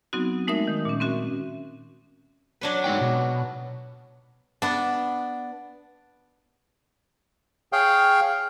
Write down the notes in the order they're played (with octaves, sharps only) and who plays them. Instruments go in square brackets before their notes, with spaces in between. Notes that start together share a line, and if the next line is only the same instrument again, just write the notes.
[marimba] F#3 B3 C4 D#4 F#4
G#3 A3 D#4 A#4 E5 D#6
D#3
A#2 C#4
C4 C#4 F#4 E5
[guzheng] F#3 D4 B4
[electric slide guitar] G#3 D#4 G5
B2
[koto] B3 D4
[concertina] G#4 C#5 F5 G5